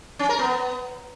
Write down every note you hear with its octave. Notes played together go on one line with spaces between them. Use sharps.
C#4
A#4
B3